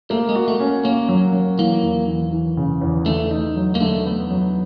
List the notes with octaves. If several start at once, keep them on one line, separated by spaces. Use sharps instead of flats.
A3 A#3
G#3
F#4
A3
C#4
A#3 C#4
F#3
F#3
E3 A#3
E2
E3
E3
C#3
E2
D3 A3
D#4
F#3
A#3
D3 A3
B3
F#3